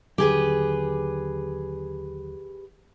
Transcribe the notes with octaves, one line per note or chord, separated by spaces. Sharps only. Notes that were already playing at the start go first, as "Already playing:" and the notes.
D#2 D3 F#3 G4 G#4 B4